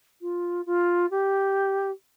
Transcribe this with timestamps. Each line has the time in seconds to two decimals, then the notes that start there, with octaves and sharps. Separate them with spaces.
0.21 F4
0.66 F4
1.11 G4